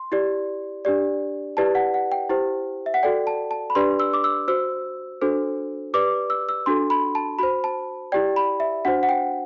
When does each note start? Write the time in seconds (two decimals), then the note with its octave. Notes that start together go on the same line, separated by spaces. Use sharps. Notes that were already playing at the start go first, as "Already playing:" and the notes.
Already playing: C6
0.12 E4 G4 D5
0.85 D4 G4 D5
1.57 E4 G4 B4 D5 A5
1.75 F#5
1.94 F#5
2.12 G5
2.29 E4 G4 C5
2.86 E5
2.94 F#5
3.03 F#4 A4 D5 G5
3.27 A5
3.51 A5
3.70 B5
3.75 D4 G4 B4 D5 C6
4.00 E6
4.13 D6
4.24 E6
4.48 F#4 C5 E6
5.22 D4 F#4 A4 C5
5.94 G4 B4 D5 D6
6.30 E6
6.49 E6
6.66 D4 F#4 A4 C6
6.90 B5
7.15 A5
7.39 F#4 C5 B5
7.64 A5
8.12 E4 G4 D5 G5
8.36 B5
8.60 E5
8.85 D4 F#4 C5 F#5
9.03 F#5
9.09 G5